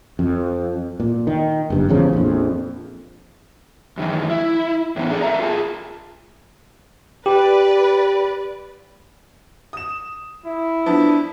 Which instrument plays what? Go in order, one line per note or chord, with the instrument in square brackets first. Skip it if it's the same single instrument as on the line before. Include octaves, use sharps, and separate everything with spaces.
[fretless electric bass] F2
A#2
D#3
F#1 G2
G#1 E2 C#3 F3
A#1 F2
[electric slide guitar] F#2 D#3 E3
E4
A2 E3 B3
D4 G#4 A4 B4 D5
A4 A#4 E5 A#5
F4 G#4 A5
[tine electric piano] G4 [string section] B4 D5
[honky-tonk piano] D#6 E7
[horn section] E4
[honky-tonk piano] F3 B3 A5 [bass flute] D4